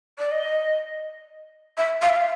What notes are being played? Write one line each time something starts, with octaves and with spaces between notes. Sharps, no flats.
D5
D#5
E5
F5
E5
F5